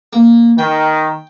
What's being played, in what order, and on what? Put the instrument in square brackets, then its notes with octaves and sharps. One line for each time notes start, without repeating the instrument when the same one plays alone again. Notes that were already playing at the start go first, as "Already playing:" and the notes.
[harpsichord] A#3
[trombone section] D#3 [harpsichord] G5